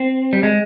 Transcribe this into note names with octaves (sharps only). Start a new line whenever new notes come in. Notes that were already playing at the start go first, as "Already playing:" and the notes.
Already playing: C4
G3
G#3